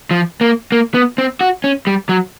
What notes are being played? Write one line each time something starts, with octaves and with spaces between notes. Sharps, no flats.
F3
A#3
A#3
B3
C4
F#4
C#4
G3
F#3